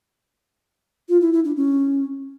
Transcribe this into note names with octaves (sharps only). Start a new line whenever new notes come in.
F4
E4
E4
D4
C#4